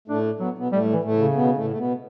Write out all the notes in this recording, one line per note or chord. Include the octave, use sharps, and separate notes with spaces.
A2 A3 D4
F#3 B3
B2 B3
A2 G3 A3
E3
A2 A3
C#3
B2 B3
A2 A3
A3
B2 B3